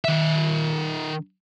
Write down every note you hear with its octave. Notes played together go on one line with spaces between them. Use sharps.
D#3 E5